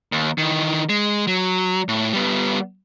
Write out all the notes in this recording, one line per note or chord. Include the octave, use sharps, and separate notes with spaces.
D#2
D#3 E3
G#3
F#3
A2
G3 B3